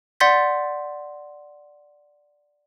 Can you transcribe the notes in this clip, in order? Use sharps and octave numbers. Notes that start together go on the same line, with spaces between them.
D5 F#5 C6 G6 A6 B6